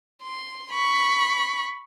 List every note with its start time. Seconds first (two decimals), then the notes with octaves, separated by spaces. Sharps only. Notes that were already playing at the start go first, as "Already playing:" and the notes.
0.22 C6
0.72 B5 C#6